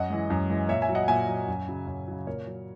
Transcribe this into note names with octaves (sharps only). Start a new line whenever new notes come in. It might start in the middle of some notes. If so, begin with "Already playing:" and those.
Already playing: F#2 D#5 F#5
E3 G#3
F#2
E3 G#3
A#2 C#5 E5
E5 G#5
F#3
D#5 F#5
A#2 E5 G#5
F#3
F#2
C#3 F#3
F#2
C#3 F#3
A#2 A#4 C#5
F#3